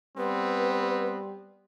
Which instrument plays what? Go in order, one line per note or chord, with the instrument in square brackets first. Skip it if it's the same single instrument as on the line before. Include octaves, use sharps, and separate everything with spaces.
[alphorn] G3 [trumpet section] B3 C4 [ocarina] B4